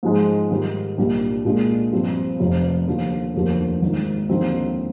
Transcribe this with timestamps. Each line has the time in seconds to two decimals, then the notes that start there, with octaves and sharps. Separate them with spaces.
0.03 G#2 F3 G#3
0.50 G#2 D#3 G3
0.98 C2 A#2 G3 D4
1.45 A#2 G#3 D4
1.92 G2 F3 C4
2.39 F1 F2 C3
2.86 D#2 D3 F3
3.34 F1 D#2 D3 F3 A#3
3.82 G#1 G#2 D#3
4.29 D#2 D3 F3 C4 D#4